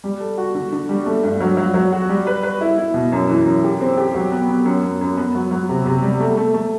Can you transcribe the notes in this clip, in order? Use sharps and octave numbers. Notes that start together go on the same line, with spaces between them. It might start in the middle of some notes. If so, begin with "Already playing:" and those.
G3
A4
F#4
D3
D3
G3
A3
G2
F#3
F#3
F#3
F#4
G3
B4
B4
E4
E4
B2
F#2
E3
F#2
G4
C4
G4
F#3
B3
B3
F#2
F#2
F#2
B3
F#3
F#3
C3
C3
G3
A3
A3
A3